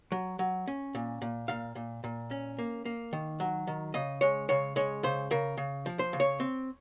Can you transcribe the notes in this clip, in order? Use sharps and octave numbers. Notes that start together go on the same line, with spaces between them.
F#3
F#3
C#4
A#2
A#2
A#2 F5
A#2
A#2
C#4
A#3
A#3
D#3
F#3
D#3
C#3 D#5
G#3 C#5
C#3 C#5
G#3 C#5
C#3 C5
C#3 A#4
C#3
F3
C5
C#3
C#5
C4